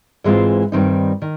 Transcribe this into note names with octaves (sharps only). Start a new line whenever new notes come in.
G#2 E3 G#3 C4 F4
G2 D#3 G3 C4 D#4
D#3